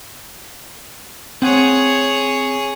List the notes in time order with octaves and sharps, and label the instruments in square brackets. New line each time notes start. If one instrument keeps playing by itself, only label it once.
[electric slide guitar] C4 F#5 [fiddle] G#4 C#5